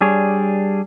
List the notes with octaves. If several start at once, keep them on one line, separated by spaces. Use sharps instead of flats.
G3 D4 G#4 C#5